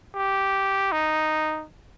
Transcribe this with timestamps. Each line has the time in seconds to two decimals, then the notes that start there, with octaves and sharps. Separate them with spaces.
0.15 G4
0.92 D#4